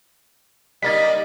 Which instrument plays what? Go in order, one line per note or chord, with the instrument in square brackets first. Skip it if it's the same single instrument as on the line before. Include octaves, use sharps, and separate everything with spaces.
[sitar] G3 A#3 D#4 [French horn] D#5 [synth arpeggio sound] A6 B6